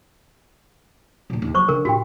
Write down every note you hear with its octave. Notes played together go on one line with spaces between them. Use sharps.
D2 A#2
D#2
F#3 C5 C#6 D6
D3 A#4
A2 F#4 G4 G5